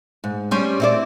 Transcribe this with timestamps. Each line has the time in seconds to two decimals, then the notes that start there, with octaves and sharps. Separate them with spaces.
0.24 G#2
0.51 G3 C#4 C5
0.80 C4 E4 D5